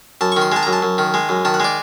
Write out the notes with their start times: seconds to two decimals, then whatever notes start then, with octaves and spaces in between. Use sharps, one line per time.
0.21 F#2 A5
0.32 C#6
0.37 D#3 C6
0.52 G#3 A5
0.63 F#2 A#5
0.73 A5
0.82 F#2
0.98 D#3
1.14 G#3
1.29 F#2
1.45 D#3 A5
1.54 F#5
1.60 G#3 D5